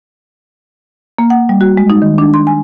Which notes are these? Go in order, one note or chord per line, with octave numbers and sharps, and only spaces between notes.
A#3
F#5
G3
F#4
G#3
D#4
D#3
D4
C6
G#5